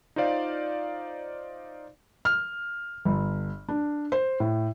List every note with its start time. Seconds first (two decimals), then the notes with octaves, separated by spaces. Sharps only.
0.16 D#4 F4 C5 D5 F5
2.25 F6
3.05 G1
3.68 D4
4.12 C5
4.40 A2